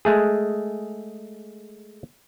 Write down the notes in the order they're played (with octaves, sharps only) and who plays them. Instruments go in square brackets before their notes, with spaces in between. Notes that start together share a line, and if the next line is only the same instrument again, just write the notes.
[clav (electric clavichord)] G#3 A3 G#4